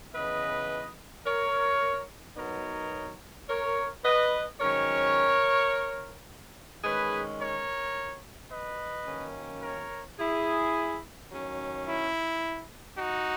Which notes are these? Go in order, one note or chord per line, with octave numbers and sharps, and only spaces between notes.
C#3 E3 B3 B4 D#5
A#4 C#5
B2 F#3 B3 D#4 A#4 C#5
A#4 C#5
B4 D#5
G#2 D#3 F#3 C#4 A#4 C#5
D#3 G#3 C#4 G#4 B4
A#4 C#5
B4 D#5
F#2 D#3 A#3 C#4
A#4 C#5
E4 G#4
D#3 F#3 C#4
E4
D#4 F#4